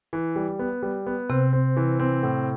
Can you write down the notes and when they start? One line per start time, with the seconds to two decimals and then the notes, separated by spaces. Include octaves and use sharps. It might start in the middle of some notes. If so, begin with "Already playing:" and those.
0.13 E3
0.36 G3
0.59 B3
0.83 G3
1.06 B3
1.30 C3 C4
1.53 C4
1.77 E3
2.00 C4
2.23 A2